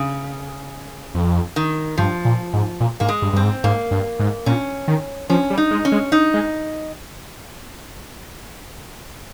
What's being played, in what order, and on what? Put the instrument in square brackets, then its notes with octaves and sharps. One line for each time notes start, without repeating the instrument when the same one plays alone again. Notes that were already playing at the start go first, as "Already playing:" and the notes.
Already playing: [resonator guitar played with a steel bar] C#3
[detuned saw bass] F2
[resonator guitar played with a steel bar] D#3
[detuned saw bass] G2 [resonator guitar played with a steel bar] F3
[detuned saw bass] A#2
G#2
A#2
[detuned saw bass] G#2 [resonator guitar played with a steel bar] A#3
[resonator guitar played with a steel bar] G#3
[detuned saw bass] G2
[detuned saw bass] G2 [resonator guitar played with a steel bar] C4
[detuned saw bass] G#2
[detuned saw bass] G#2 [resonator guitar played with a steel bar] A#3
[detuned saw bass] G2
G#2
[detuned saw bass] A#2 [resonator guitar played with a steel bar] C#4
[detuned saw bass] D#3
[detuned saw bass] F3 [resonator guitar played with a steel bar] C#4
[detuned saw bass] G3
[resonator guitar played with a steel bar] D#4
[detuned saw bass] G#3
[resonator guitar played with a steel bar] C#4
[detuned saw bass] G#3
[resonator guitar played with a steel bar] D#4
[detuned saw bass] G#3